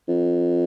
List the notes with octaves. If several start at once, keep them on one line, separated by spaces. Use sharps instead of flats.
F2